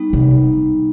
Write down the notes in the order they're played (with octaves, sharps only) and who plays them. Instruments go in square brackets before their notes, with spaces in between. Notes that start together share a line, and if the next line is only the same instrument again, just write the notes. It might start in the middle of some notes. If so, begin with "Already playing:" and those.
Already playing: [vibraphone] G3 B3 D#4
[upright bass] C3